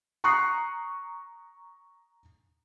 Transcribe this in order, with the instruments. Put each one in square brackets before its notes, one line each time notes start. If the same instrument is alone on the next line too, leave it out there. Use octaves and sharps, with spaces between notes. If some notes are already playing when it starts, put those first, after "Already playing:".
[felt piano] A#5 C#6 D#6 F#6 C7